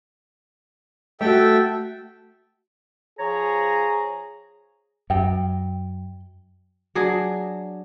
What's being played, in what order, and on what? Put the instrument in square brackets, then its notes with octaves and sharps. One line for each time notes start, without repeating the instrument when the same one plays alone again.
[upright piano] A3 F#4 [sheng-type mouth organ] A4 E5 G5
[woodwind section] F3 C#5 A#5 [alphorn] G#4
[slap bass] F#2 [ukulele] G5
[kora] F#3 D4 G#4